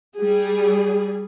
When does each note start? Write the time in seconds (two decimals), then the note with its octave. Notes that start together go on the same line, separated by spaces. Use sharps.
0.17 G3 G#4